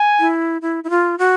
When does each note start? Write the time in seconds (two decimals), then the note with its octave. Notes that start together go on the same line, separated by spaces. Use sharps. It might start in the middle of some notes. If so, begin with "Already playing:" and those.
Already playing: G#5
0.20 E4
0.62 E4
0.84 E4
0.90 F4
1.18 F#4